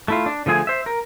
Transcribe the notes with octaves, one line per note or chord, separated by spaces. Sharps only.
A3 E4 F4
D4
D3 F3 A3 G#4 G#5
C5 E5
A#4